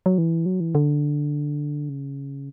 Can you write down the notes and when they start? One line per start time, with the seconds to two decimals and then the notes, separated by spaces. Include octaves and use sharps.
0.06 F#3
0.18 E3
0.46 F#3
0.60 E3
0.75 D3
1.89 C#3